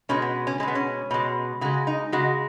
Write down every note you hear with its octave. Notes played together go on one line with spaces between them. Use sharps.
B2 G#3 C#4
B3
C#4
B2 G#3 B3 C#4
C#4
B2 G#3
C#3 G#3 F#4
D#4
C#3 G#3 F#4